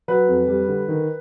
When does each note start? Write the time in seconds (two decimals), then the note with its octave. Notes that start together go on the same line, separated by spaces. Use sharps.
0.08 F#3 B4
0.28 F2
0.48 G3
0.68 D3
0.88 D#3